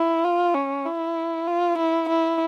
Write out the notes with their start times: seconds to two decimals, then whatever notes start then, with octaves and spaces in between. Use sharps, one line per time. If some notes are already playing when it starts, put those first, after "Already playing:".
Already playing: E4
0.24 F4
0.54 C#4
0.86 E4
1.47 F4
1.78 E4
2.09 E4